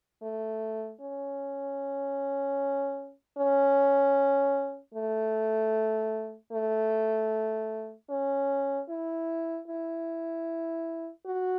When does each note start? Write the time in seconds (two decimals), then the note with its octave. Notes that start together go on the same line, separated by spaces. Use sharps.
0.22 A3
1.00 C#4
3.38 C#4
4.94 A3
6.52 A3
8.10 C#4
8.89 E4
9.68 E4
11.26 F#4